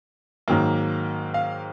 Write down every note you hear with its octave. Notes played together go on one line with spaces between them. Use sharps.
G#2 D#3 F#3 A#3
F5